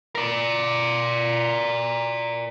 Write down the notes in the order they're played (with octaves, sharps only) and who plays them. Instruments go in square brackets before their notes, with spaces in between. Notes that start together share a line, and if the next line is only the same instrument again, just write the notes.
[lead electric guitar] A#4 D5